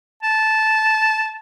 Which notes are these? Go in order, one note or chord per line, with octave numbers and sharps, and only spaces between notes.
A5